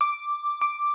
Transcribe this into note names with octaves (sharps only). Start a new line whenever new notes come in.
D6
D6